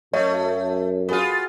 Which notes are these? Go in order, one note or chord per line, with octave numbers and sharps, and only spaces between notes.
F#2 A3 C#5 D#5
B3 F4 F#4 G#4